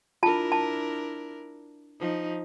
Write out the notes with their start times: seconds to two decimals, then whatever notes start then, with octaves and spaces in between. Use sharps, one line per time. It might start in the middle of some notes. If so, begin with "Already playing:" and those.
0.23 D4 E4 F4 A#4 A5
0.52 A5
2.00 F3 D#4